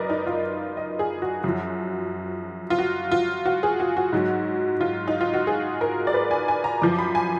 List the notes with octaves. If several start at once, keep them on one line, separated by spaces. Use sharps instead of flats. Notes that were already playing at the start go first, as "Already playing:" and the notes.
Already playing: F#2 A#4 B4 D5 D#5
D#4
F4
D#5
G#4
F#4
F#2 F3
F4
F#4
F4
F#4
G#4
F#4
F#4
G#2 F#3
F4
D#4
F4
F#4
G#4
A#4
D5
B4
G#5
G#5
A#5
F#2 F3 D6
B5
G#5